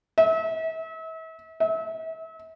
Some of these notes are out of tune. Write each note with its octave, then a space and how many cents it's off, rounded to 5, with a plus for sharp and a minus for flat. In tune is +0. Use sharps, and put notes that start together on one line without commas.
E5 -40
E5 -40